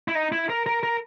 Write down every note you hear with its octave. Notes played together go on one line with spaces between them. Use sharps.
E4
D#4
E4
A#4
A#4
A#4